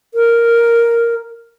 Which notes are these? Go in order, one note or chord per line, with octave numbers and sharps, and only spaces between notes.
A#4